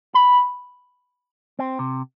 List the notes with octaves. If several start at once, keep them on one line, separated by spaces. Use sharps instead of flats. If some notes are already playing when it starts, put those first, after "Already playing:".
B5
C4
C3